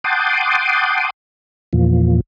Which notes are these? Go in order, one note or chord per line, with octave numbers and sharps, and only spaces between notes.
F#5 G5 A5 C6 D6 D#6
E2 A#2 F3